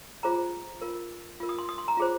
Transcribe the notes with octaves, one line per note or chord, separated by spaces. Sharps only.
F4 G#4 C5 A#5
F4 A#4
F4 A#4
D#6
C6
D#6
C6
A#5
F4 G#4 C5